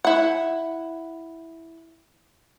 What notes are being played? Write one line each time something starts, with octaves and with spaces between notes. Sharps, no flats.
E4 F#5